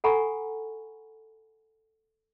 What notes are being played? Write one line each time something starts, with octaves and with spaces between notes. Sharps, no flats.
A4 F#5 G#5 A#5 B5 C#6